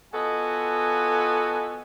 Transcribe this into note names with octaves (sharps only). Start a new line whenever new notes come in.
B3 F4 F#4 A4 D#5 G#5